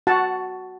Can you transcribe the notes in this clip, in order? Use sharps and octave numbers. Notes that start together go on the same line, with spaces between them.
F#4 F#5 A5